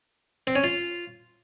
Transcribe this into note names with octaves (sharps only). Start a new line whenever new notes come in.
C4
C#4
F4